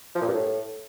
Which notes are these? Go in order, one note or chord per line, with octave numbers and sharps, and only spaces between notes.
F3
A#2
G2
A2